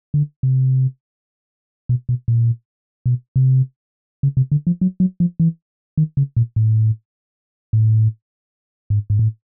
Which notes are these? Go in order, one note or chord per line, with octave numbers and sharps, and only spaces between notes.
D3
C3
B2
B2
A#2
B2
C3
C#3
C3
D3
F3
F#3
F#3
F3
E3
D#3
C#3
A#2
A2
A2
G#2
G#2
A2